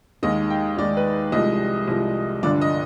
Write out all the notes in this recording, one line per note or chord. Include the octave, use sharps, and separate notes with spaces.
D#2 D#3 G#3 D#5
G5
D#2 D#3 G#3 D5
B4
C2 C3 F3 G#3 D#5
C2 C3 F3 G#3
G1 G2 D3 F3 D5
D#5